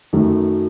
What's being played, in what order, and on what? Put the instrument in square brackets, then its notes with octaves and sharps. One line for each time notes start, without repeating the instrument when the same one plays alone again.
[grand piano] F#2 D#3 F#3 A3